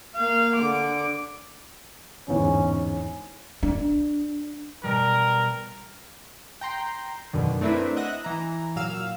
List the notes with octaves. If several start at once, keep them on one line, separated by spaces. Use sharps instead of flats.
A#3 F5
D3 D6
G1 E2 G#2 C#4
D4
B2 G3 A#4
G5 A#5 C6 C7
F#2 B2 D3 D#3
A3 C4 D4 E4 A#4 B4
D#5 E5 F#5 F#6 A#6
E3 A#5
A#2 F#3 F5 E6